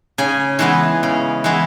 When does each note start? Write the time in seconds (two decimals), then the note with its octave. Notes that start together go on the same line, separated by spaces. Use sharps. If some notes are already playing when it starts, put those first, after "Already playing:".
0.18 C#3 G#5
0.59 E3 G#3 B3
1.03 C#3
1.44 E3 G#3 B3